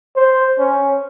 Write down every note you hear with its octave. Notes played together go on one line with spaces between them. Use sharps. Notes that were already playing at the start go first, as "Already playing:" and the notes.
C5
C#4